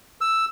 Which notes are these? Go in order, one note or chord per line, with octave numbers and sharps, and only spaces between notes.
E6